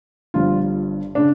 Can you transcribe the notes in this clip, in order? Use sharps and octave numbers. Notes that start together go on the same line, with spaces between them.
G1 G2 F3 F4
C#3 D4